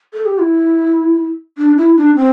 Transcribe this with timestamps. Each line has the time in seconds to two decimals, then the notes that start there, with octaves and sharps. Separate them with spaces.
0.14 A4
0.26 G4
0.39 E4
1.58 D4
1.77 E4
1.97 D4
2.16 C4